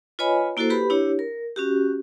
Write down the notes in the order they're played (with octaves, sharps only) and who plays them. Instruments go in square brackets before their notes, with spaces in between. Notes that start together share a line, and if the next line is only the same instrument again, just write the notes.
[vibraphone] F4 B4 C#5 D#5 G#5 B5
A#3 E4 F#4 A4 C5
G4 B4 B5
D4 E4 G4 C#5
A#4
C#4 F#4 G4